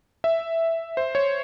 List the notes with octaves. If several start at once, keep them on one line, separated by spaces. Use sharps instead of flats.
E5
C5
C#5